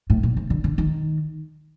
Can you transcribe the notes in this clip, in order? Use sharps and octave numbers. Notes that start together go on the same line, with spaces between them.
A2
A#2
C3
D3
D3
D#3